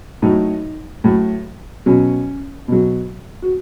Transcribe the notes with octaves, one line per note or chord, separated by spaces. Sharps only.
A2 F#3 D#4
A2 F#3
B2 F#3 C#4
B2 F#3
F#4